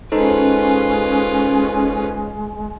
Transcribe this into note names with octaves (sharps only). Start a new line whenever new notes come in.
G#3 C#4 D#4 F4 A4 B4 C5